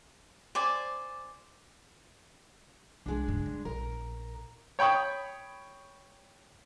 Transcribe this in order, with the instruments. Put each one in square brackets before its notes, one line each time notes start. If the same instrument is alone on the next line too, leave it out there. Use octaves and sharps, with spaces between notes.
[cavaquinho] C5 D5 G#5
[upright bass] C2 [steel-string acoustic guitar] G#3 D4
[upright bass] G2 C#3
G3
[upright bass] A#1 [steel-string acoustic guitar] A#4
[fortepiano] C#5 G5 B5 C#6 D#6